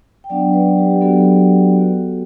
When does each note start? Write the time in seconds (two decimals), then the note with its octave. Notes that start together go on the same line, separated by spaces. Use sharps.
0.24 G5
0.29 F#3 B3 D4 D5 F#5
0.53 B4 D5
0.78 G4
0.94 G4
1.01 F#3 B3 D4 F#4 A4
1.73 B3 F#4